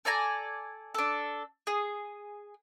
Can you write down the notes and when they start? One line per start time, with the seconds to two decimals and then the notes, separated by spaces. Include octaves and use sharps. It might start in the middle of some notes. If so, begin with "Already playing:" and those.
0.05 A4 D5 G#5 A#5
0.94 D4 A4
1.67 G#4